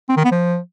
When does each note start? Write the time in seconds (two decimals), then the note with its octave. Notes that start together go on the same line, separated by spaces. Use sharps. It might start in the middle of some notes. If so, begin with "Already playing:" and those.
0.09 C4
0.17 D#3
0.24 B3
0.32 F3